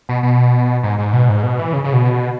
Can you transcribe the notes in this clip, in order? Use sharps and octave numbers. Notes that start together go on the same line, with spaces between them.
B2
B2
G#2
G#2
B2
G#2
B2
E3
C#3
C#3
B2